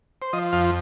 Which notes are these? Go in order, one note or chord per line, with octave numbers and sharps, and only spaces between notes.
C5
F3 D#5
F2 F5